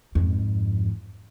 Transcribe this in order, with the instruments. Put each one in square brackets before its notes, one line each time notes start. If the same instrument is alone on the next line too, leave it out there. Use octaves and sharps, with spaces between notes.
[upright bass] F2 G#2